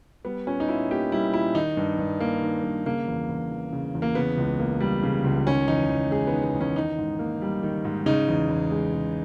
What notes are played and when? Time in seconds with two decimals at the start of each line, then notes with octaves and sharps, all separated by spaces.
0.25 G3 B3
0.47 A#2 C#4
0.60 D#4
0.68 A#2 E4
0.91 A#3 G4
1.12 G3 E4
1.33 A#2 E4
1.55 D#3 D#4
1.77 G2
1.98 G2
2.20 A#3
2.42 D#3
2.63 G2
2.85 C#3 A#3
3.08 E2
3.29 E2
3.50 E3
3.72 C#3
3.95 E2
4.02 A#3
4.15 C#3 B3
4.37 C#2
4.59 A#3
4.80 G3
5.03 C#3
5.24 C#2
5.47 D#3 C#4
5.68 E2 D#4
5.89 E2
6.11 G#3 G#4
6.27 B3
6.32 D#3
6.44 B3
6.54 E2
6.61 C#4
6.76 D#3 D#4
6.98 G#2
7.19 A#3
7.42 G3
7.63 D#3
7.85 G#2
8.06 C#3 D#4
8.28 E2
8.49 E2
8.72 G#3
8.94 C#3